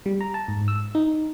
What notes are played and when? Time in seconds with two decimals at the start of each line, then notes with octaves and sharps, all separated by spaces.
0.06 G3
0.21 A#5
0.34 A5
0.48 G#2
0.68 E6
0.95 D#4